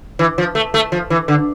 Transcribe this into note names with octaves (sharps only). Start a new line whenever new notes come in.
E3
F3
A3
A3
F3
E3
D3